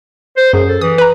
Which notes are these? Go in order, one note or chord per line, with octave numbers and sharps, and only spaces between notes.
C5
F#2 G#4
A4
E3 D#6
B4 A#5